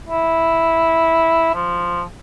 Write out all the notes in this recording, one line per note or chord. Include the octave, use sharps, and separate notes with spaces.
E4
F3